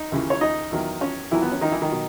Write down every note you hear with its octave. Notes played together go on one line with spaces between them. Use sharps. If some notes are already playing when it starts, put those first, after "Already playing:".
Already playing: D#4
D#2 C#3 E3
C#5
D#4 D#5
E2 D#3 F#3
C#4 C#5
E2 D#3 E3 F#3 E4
B3
C#4
D#3 D#4
E3 E4
D#3 D#4
B2 F#3